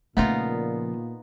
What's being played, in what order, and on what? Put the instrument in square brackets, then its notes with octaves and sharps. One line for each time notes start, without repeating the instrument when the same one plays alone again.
[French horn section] A#2 [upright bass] C#3 F3 [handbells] A3 [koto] B3 D#4 F4